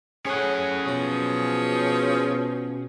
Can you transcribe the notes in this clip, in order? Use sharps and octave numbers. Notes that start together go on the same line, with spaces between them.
A2 C#4 G#4 C#5 F#5
B2 F3 G#4 C#5